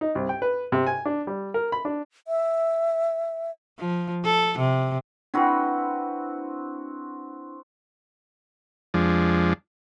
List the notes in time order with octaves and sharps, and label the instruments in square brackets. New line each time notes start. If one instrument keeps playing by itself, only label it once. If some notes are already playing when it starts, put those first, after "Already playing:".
[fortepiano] D#4
C2
G5
B4
C3
G#5
D4
G3
A#4
B5
D4
[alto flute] E5
[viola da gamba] F3
A4
C3
[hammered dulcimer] C4 F#4 B4 [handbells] D4 E4
[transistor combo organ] F2 F3 G#3 D4